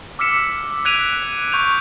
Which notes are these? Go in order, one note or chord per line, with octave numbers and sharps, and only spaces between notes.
D6 E6 F6 B6 C#7 E7
F#6 G#6 B6 D7 D#7 F7
C#6 G6 F7